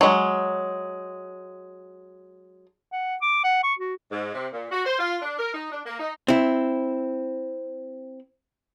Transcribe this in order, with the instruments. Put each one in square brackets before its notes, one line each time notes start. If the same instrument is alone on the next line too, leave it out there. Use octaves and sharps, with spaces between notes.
[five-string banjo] F#3 G#3
[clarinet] F#5
D6
F#5
C#6
F#4
[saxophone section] G#2
C3
A#2
F#4
C5
F4
D4
A#4
D#4
D4
A#3
D#4
[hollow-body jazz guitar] C4 E4